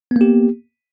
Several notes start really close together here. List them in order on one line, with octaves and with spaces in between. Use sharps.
B3 A#3 G4